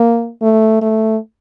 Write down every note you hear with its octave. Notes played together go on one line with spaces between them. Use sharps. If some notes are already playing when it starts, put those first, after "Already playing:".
Already playing: A#3
A3
A3